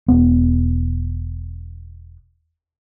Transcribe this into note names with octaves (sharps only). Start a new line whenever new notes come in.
E1 B3